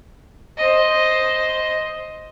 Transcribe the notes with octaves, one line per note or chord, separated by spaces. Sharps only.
C5 D#5